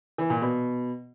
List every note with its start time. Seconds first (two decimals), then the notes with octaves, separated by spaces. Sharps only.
0.18 E3
0.30 A#2
0.41 B2